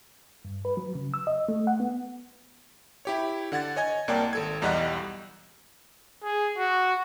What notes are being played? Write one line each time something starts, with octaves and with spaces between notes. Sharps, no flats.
G2
B4
F#3
C#3
E6
D#5
A3
F#5
B3
E4 G4 C#5
D3 F#5 G#6 A6
C#5 D#5 G#5 G#6
C2 A#3 C#5 D5 G5 A5
G#1 A4 G#6
B1 E2 G3 D#5 F#5 F#6
G#4
F#4